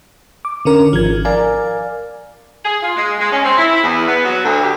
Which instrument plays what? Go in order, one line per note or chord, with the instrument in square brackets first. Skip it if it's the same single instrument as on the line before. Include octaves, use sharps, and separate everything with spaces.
[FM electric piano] D6
D3 C#4 A#4
[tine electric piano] G#1 [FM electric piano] F3 G#6
[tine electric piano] A#4 D5 F5 [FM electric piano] G#5
[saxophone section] G#4
F4
G#3
G#3
C#4
C4
E4
E2
B3
F#3
D2
G4